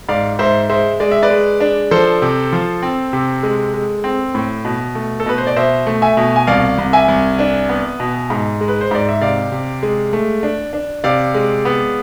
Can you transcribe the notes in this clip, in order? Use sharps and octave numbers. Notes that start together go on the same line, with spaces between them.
G#2 D5 F5
G#2 C5 E5
G#3 C5 E5
G#3 D5
E5
B4 D5
G#3
D4
F3 A4 C5
C3
F3
C4
C3
G#3
G#3
C4
A2
B2
A3
A4
B2 B4
C5
D5
B2 C5 E5
A3
E5 G#5
B2
G#5
C2 D5 F5
C2
E5 G#5
C2
D4
B3
B2
G#2
G#3
B4
C5
G#2 D5
E5
C3 D5 F5
C3
G#3
A3
D4
D4
C3 D5 F5
G#3
B3